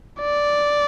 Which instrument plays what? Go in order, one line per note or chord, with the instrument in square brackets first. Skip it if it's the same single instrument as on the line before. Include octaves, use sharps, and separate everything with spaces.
[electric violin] D5